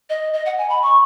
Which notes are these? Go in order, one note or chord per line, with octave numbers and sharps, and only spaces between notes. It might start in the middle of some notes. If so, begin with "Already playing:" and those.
D#5
D#5
F#5
G#5
B5
C#6